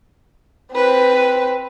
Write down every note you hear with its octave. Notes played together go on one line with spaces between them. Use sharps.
C4 B4